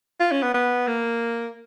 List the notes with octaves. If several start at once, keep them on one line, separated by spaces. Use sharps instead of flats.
F4
C#4
B3
B3
A#3